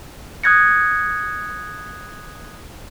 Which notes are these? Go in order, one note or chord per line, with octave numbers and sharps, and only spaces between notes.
D#6 F#6 G#6 A#6 C#7